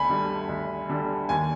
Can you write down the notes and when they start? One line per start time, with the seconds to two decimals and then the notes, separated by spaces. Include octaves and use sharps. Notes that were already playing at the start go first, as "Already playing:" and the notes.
Already playing: D2 G#5 B5
0.09 D3 G3
0.49 D2
0.89 D3 G3
1.29 D#2 G#5